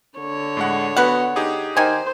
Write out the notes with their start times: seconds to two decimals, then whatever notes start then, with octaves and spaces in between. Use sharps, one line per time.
0.19 D3 C#5
0.57 A2 G#3 F#5
0.97 B3 F#4 B4 F#5 F#6
1.36 D#4 G4 G#4
1.77 D#3 C5 G#5